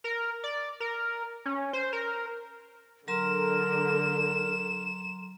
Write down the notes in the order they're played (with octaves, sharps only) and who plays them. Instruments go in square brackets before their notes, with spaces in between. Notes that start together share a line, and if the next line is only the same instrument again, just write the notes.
[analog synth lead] A#4
D5
A#4
C#4
C5
A#4
[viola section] D3 [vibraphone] F#3 A#5 C6 [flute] A#4 [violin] E7